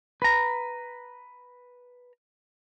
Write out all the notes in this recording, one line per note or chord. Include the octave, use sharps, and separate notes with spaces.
B4 A#5